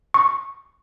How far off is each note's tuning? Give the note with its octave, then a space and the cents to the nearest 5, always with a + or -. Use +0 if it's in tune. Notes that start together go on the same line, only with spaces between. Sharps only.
C#6 -5